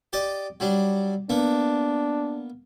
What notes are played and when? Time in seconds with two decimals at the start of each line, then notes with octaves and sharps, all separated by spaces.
0.13 G4 D5 D#5
0.60 F#3 G3 D4
1.30 A#3 B3 D4